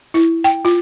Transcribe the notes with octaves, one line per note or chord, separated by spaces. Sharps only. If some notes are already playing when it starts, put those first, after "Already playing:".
E4
G5
F4